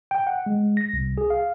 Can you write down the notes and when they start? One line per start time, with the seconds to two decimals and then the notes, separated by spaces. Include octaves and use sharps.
0.11 G5
0.27 F#5
0.46 G#3
0.77 A#6
0.93 C2
1.18 G#4
1.30 F5